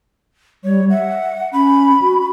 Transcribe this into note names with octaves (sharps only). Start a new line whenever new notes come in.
G3 C#5
E5 F#5
C#4 B5
F#4